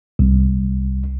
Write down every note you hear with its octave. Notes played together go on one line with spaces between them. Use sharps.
C2